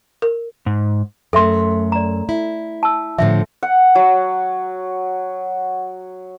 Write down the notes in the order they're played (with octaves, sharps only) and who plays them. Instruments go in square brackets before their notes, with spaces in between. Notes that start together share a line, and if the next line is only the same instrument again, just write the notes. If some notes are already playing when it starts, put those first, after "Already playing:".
[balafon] A#4
[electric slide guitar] G#2
[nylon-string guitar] F#2 A3 [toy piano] A4 E5 C6
[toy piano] D5 A#5
[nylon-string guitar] E4
[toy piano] A5 E6
[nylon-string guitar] A2 D3 F3 [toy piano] E5
[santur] F#5
F#3